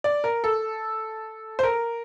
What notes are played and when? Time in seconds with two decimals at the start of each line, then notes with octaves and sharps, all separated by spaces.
0.04 D5
0.24 A#4
0.44 A4
1.59 C5
1.63 A#4